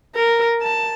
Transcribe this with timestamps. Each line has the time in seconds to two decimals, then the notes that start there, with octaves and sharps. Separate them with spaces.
0.15 A#4
0.62 A5